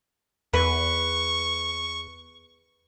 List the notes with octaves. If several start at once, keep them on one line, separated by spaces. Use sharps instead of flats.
E2 B4 C#6